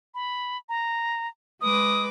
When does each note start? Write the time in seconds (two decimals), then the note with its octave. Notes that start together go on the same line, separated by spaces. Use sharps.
0.15 B5
0.69 A#5
1.61 G#3 B4 D6 D#6